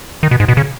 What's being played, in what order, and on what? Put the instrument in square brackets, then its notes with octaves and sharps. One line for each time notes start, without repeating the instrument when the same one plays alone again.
[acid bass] D#3
B2
G#2
B2
C#3